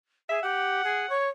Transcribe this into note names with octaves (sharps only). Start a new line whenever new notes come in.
G#4 E5
G4 F#5
G#4
C#5